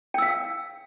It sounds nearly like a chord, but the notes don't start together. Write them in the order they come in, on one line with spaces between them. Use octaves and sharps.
G5 E6 F5